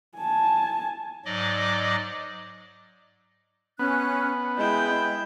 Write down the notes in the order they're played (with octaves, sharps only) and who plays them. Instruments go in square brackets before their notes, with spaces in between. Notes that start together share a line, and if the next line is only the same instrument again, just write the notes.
[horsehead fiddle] G#5 A5
[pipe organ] G#2 F#3 D5 D#5 D6
[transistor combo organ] B3 [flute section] C#4 F#6
[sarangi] G#3 [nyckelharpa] E4 G5 [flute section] G6